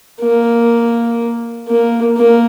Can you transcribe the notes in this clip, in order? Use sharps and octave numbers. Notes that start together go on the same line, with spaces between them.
A#3
A#3
A#3